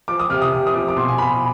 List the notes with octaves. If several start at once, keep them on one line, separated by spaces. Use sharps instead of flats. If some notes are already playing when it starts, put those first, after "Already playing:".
F3 D6
D#6
C3 F6
D#6
C3
D#6
F3 D6
D6
B2 C6
G#5
B2 B5